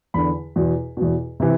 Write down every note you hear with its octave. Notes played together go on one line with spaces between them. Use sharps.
E2 D3 B5
E2 B2
E2 B2
C3 E3